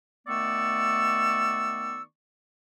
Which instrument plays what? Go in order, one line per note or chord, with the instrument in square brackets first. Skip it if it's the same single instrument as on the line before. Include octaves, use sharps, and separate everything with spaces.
[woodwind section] D#3 A3 B3 D5 C#6 E6